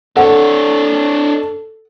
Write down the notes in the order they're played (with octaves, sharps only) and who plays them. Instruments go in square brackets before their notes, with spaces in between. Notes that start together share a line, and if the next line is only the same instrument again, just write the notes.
[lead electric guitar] D4 C#5 [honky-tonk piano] A4 [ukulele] F#5